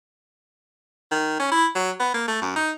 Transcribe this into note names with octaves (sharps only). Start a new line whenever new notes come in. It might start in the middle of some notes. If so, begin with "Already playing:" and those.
D#3
C#4
E4
F#3
B3
A#3
A3
F#2
D#4